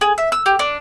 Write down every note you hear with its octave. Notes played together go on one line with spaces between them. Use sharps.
G#4
E5
E6
G4
D4